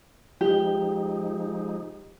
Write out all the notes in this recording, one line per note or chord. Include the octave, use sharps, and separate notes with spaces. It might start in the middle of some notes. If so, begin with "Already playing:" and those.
F3 G#3 D#4 G4